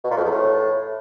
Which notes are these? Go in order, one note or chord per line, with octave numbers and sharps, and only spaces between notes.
B2
A#2
F2
E2
A2